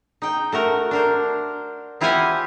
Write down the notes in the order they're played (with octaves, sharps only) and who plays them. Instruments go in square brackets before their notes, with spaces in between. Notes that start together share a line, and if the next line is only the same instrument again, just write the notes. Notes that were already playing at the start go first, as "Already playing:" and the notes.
[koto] D#4 G5
A3 F#4 A#4
D4 A#4 C5
C4 E4 F4 G4 F#5 G#5